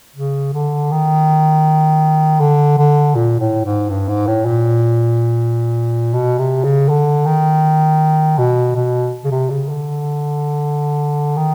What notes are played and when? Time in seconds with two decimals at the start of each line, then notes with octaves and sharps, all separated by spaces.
0.16 C#3
0.53 D3
0.91 D#3
2.40 D3
2.78 D3
3.15 A#2
3.40 A2
3.65 G#2
3.89 G2
4.08 G#2
4.27 A2
4.45 A#2
6.14 B2
6.38 C3
6.64 C#3
6.89 D3
7.26 D#3
8.38 B2
8.75 B2
9.24 C#3
9.31 C3
9.50 C#3
9.69 D3
11.37 D#3